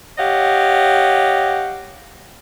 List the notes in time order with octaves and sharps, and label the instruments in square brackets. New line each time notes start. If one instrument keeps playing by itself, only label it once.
[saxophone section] G4 C#5 D#5 F5 F#5